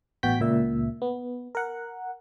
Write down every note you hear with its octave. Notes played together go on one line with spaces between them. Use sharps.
A1 B2 F#4 G5 G6 B6
C#2 A#2 E5
B3
A#4 F#5